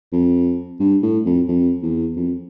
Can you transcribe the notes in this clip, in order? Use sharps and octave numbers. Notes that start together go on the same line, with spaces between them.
F2
G2
A2
F2
F2
E2
F2